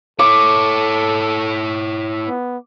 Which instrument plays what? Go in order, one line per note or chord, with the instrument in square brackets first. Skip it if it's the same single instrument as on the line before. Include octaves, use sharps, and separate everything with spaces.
[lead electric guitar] E4 C#5 [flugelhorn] A4 [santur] D6
[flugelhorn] B3